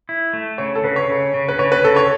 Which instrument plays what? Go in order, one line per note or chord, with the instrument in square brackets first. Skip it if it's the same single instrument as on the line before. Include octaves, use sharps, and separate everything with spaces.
[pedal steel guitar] E4
A3
[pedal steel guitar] C#3 [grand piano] C#5
[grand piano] A4
[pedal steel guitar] C#3 [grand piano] B4
[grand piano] C#5
[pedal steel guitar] C#3
C#3
[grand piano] B4
[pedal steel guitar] C#3 [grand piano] C#5
[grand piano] B4
[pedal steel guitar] C#3 [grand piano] A4
[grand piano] C#5